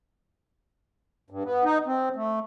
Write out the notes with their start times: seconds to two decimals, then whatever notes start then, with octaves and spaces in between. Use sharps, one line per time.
1.30 G2
1.45 B3
1.64 D#4
1.86 C4
2.16 A3